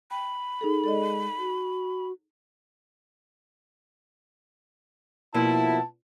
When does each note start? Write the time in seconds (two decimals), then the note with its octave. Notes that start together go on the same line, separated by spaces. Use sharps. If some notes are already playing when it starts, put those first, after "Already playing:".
0.11 G5 B5
0.61 D#4 G#4 A4
0.84 G#3 A4 D5 D#5
1.38 F#4
5.34 B2 F3 A#3 E4 A5